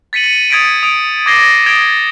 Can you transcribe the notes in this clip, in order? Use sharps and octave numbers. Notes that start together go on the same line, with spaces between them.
A6 B6 C#7 D#7 F#7
D#6 G#6 A6 B6 C#7 D7
D#6 D7
D6 D#6 G#6 A#6 C7 G7
D#6 G#6 A6 D7 D#7 G7